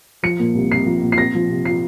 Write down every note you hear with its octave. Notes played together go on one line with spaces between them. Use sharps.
F3 C#7
A#2
C2
C2 C7
F3
A#2
C7
C4 A#6
F3
C3
F4 C7